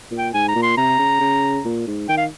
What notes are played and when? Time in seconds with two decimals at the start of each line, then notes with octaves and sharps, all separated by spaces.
0.11 A#2
0.18 G5
0.34 G#2 G#5
0.48 A#5
0.56 A#2
0.62 C6
0.77 C3 A#5
0.99 C#3
1.21 C#3
1.65 A#2
1.87 G#2
2.09 D#3 G5
2.17 F5